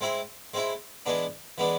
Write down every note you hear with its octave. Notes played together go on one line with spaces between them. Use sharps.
G#3 C4 E4
G#3 C4 E4
E3 G#3 B3 D4
E3 G#3 B3 D4